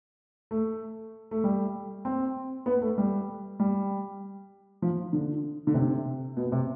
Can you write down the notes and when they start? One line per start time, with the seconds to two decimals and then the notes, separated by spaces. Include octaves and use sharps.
0.51 A3
1.31 A3
1.44 G3
2.05 C4
2.66 B3
2.82 A3
2.98 G3
3.60 G3
4.82 F3
5.13 D3
5.67 D3
5.74 C3
6.37 B2
6.52 C3